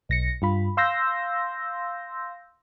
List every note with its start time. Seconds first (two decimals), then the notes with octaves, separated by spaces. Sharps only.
0.09 B1 A#6 C#7
0.42 G2 F4 B5
0.77 F5 C6 E6 G6 A#6